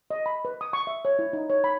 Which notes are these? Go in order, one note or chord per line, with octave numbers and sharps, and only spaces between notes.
D#5
B5
B4
D#6
C#6
E5
C#5
E4
D#4
C#5
B5